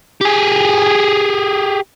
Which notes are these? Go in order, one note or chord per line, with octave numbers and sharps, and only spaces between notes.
G4 G#4